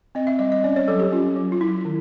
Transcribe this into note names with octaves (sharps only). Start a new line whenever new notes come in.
C4 D#5
E5
G3 D#5
D#5
C#4 D5
C#5
F#3 A4
G4
C#4 F4
F#3
F4
F#3 E4
D#3